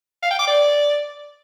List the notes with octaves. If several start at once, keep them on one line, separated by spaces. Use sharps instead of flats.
F5
G5
D6
D5